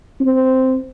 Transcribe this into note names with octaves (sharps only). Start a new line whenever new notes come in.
C4